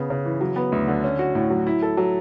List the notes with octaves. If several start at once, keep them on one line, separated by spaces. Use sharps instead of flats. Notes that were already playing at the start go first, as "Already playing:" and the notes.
Already playing: C#3 B3
C#3
E3
F#3
B3
D2
D3
C#4
F#4
A2
F#3
E4
A4
F#3